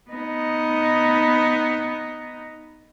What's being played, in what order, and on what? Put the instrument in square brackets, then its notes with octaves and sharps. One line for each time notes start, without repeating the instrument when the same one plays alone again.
[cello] B3 D#4